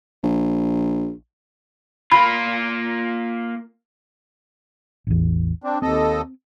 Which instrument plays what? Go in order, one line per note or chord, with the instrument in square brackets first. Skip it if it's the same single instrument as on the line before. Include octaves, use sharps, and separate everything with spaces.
[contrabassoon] A#1
[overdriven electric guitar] A#3 F4 [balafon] B5
[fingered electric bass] A1 E2
[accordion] C4 D4
[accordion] D#2 A4 D#5 [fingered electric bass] C4